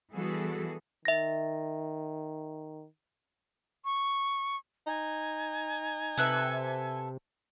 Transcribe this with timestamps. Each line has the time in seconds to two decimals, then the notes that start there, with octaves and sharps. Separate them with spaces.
0.11 E3 G3 B3 F#4 G#4 A4
1.05 D#3 E5 A#6
3.85 C#6
4.87 D#4 G#5
6.17 C3 A4 B4 E5